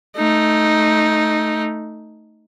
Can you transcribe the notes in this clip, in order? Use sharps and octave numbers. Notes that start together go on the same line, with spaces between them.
A3 D#4